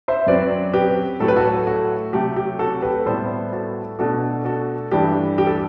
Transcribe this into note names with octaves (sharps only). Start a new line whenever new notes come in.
C5 E5
F#2 F#3 C4 B4 D5
G4 B4
A2 F#3 A3 A4
B4
F#4 A4
F#4
C3 F#3 A3 G4
G4
F#4 A4
G4 B4
A2 G3 B3 A4 C5
F#4 A4
B2 A3 D4 F#4 A4
F#4 A4
G2 E3 A3 D4 G4
G4
A4